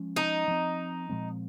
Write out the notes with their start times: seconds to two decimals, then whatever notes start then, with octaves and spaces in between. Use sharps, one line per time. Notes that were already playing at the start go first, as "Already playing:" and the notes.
Already playing: F3 G#3 C#4
0.16 D#4
0.48 F3 C4
1.09 A#2 F3 G#3 C4